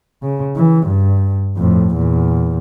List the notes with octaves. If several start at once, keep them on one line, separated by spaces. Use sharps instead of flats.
C#3
E3
G2
F2 A2
E2 A#2